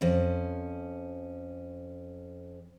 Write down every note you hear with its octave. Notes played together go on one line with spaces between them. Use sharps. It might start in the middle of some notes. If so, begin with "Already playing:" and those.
F2 C#4